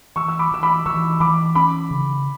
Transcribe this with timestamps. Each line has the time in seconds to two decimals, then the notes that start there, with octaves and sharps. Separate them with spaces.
0.16 E3 C#6 E6
0.28 E6
0.39 B5 D6
0.52 E3 E6
0.63 B5 D6
0.86 E3 C#6 E6
1.20 E3 B5 D6
1.55 C#4 B5 D6
1.91 C#3